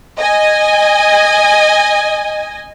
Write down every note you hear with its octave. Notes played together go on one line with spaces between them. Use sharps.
D#5 G#5